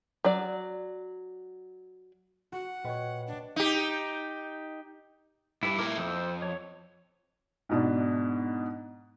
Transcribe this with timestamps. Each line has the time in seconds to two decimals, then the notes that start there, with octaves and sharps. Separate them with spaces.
0.25 F#3 D5
2.52 F#4 F#5
2.85 A#2 B4 C#5 D#5 G5
3.27 D4
3.56 D#4 G4
5.63 G2 E4 B4
5.79 A#2 E4 A#4 D6
5.98 F2 C5 E6
6.42 C#5
7.69 G#2 B2 D4